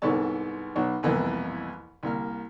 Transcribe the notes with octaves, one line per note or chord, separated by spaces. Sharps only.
C2 G#2 B3 A4 C#5 A5
B1 B2 C#5
C2 F2 B2 E3 A#3 E4
C2 A#3 F6